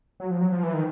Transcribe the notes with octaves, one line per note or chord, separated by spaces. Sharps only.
F#3
F3
F#3
F3
E3
D#3